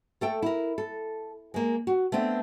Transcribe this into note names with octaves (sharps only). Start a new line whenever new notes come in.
A3 A4 G5
E4 A#4
A4
G#3 A#3
F#4
A3 B3 C4 D4